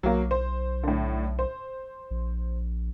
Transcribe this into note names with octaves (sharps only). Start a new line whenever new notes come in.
B1 F#3 A#3
C5
A2 D3
C5
A#1